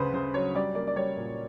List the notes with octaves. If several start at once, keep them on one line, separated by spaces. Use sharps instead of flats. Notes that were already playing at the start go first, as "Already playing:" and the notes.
Already playing: D2 C#3 B4 C5
C#3 C5
F#3 C#5
G3 D5
A#3 D5
D5
G3 C#5
A#2